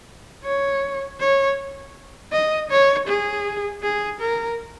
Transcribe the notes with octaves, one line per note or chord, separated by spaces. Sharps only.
C#5
C#5
D#5
C#5
G#4
G#4
A#4